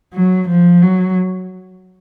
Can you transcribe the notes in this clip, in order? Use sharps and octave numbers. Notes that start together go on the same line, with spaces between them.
F#3
F3
F#3